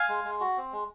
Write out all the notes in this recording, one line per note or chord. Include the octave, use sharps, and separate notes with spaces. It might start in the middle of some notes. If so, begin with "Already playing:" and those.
Already playing: F5 G#5
G#3
G#3
F#4
C4
G#3